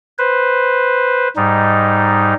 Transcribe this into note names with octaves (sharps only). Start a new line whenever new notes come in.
B4 C5
G#2 G3 D#4